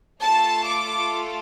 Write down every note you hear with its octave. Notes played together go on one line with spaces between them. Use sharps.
A3 F4 A4 A5
D6